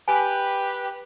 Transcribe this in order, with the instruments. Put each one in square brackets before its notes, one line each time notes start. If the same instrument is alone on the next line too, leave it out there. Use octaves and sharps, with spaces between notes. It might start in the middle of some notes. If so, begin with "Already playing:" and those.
[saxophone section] G4 B4 [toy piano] G#5